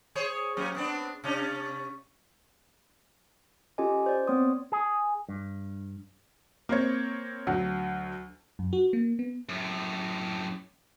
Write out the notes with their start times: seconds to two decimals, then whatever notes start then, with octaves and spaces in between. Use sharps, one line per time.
0.15 G#4 C5 C#5
0.57 F#3 A#3 C#4
0.75 B3 C4 D4
1.24 C3 C#4 D4
3.78 C#4 F4 G4 A4 D#5 G#5
4.06 C5 D5
4.27 B3 C4 C#5 C6 D#6
4.72 G#4
5.29 G2
6.69 A#3 C4 C#5
7.47 D2 F#3
8.59 F#2
8.73 F#4
8.93 A#3
9.19 B3
9.49 F#2 A2